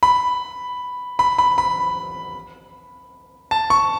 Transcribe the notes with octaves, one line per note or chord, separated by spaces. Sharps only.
B5
B5
B5
B5
A5
C#6